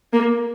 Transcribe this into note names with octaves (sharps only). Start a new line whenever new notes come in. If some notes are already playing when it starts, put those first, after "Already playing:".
A#3